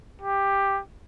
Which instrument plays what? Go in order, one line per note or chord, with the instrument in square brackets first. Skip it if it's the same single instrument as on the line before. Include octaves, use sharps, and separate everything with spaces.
[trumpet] G4